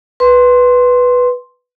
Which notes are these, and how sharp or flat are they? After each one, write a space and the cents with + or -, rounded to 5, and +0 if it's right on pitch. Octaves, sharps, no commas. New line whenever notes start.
B4 +0 C6 +5